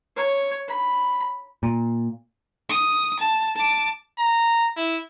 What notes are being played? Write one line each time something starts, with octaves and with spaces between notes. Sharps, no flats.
C#5
B5
A#2
D#6
A5
A5 D6
A#5
E4